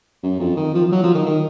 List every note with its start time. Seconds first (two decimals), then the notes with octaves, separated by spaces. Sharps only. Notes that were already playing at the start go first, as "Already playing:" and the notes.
0.23 F#2
0.40 F2
0.57 D#3
0.74 F3
0.86 F3
0.92 F#3
1.03 F3
1.15 D#3
1.26 D#3